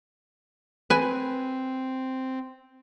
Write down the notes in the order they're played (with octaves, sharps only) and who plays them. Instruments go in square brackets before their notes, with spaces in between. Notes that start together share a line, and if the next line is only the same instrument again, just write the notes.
[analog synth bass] C4 [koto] B4 G#5